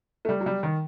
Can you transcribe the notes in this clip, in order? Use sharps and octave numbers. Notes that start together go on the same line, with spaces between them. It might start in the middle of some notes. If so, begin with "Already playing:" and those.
A3
G3
F#3
G3
D#3